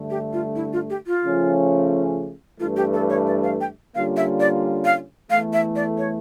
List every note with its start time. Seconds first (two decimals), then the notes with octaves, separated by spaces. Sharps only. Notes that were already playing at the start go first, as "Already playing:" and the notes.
Already playing: G2 D3 A3
0.10 G4
0.33 F4
0.56 E4
0.73 F4
0.90 G4
1.07 F4
1.24 C#3 F3 A3 C#4
2.59 G2 E3 A3 F4
2.76 G4
2.93 A4
3.10 C#5
3.27 D5
3.44 F5
3.61 G5
3.95 D3 G3 A#3 C#4 F4 F5
4.17 E5
4.40 D5
4.85 F5
5.30 E2 E3 A3 F5
5.53 E5
5.76 D5
5.98 C#5